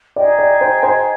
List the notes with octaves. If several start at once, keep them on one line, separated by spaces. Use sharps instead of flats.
D#4 G#4 D5 D#5 G5
D5
C5
C5